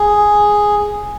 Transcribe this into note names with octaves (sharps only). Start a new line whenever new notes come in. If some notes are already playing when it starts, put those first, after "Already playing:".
Already playing: G#4